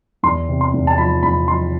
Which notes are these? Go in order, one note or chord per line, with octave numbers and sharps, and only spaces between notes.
E2 C6
C3
C6
E2
A5
F3 B5
E2 B5
F3 C6